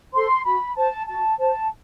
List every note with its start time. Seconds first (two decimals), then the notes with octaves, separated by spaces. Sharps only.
0.13 A4 C5 C6
0.44 F#4 B5
0.76 C5 A5
1.07 F#4 A5
1.39 C5 A5